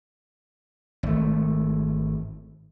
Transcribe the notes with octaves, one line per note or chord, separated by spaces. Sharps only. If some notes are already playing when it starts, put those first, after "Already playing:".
G#1 A3